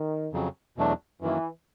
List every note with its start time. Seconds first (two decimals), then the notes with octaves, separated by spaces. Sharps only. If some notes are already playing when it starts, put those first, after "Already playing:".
Already playing: D#3
0.33 F2 C#3 F#3
0.77 E2 B2 F#3 A3 D4
1.21 F#2 D#3 E3 F#3 A#3